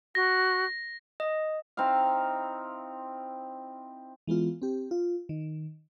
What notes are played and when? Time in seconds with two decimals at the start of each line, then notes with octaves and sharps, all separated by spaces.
0.15 F#4 A#6
1.20 D#5
1.77 C4 D#4 E4 F5
4.27 E3 G#3 B3 F4
4.62 C4 G4
4.91 F4
5.29 D#3